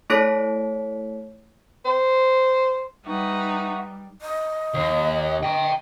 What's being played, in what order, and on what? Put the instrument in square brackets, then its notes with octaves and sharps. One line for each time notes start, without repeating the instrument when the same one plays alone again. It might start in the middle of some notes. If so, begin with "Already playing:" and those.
[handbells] A3 E4 A4 C#5 B6 D7
[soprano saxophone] C5
[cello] G3 [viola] D#4 B4 [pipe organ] E5 F#5 C#6
[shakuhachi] D#5
[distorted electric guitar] D#2
G5 A#5